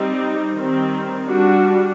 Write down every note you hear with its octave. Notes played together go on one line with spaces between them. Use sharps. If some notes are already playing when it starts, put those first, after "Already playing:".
Already playing: G3 C4 D#4
D#3 G3 C4
G3 D4 F#4